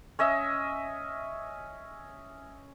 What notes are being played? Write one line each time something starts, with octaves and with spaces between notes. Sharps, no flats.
C#4 D#5 E5